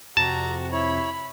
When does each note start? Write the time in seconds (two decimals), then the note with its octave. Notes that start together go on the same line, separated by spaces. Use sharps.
0.17 F2 C3 F#4 A5 A#5
0.72 E4 C#5 B5